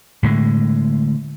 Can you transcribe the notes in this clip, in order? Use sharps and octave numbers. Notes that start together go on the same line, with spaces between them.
A2 D3 G#3